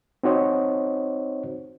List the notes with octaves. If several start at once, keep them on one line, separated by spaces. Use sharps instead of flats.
C4 D#4 F#4 C5 C#5 D#5